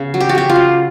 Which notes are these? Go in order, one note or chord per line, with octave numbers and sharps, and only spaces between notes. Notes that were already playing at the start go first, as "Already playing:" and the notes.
Already playing: C#3 B3
F#3
G4
F#4
C#3 G4
F4
F#3